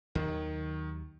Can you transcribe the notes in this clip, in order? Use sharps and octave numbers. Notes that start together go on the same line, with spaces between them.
D#2 D#3 F#3